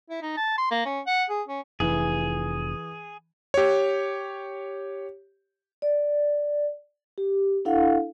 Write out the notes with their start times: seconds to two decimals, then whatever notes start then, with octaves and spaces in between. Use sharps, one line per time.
0.10 E4
0.22 D#4
0.37 A5
0.58 C6
0.71 A#3
0.85 C#4
1.07 F#5
1.30 G#4
1.48 C#4
1.80 F1 E3 G#4
3.54 G4 C#5
5.82 D5
7.18 G4
7.65 D4 E4 A4 F5 F#5